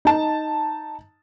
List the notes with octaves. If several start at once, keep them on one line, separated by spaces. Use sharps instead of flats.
D#4 A5